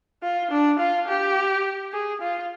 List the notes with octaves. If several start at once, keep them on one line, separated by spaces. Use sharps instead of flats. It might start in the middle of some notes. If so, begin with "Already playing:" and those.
F4
D4
F4
G4
G#4
F4